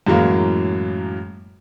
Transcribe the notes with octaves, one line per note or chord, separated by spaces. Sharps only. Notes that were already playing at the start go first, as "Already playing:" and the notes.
F#2 A2 E3 F#3 G#3 A#3